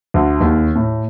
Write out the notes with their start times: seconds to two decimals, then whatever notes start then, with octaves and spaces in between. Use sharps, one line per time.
0.14 D2
0.41 D#2
0.76 A2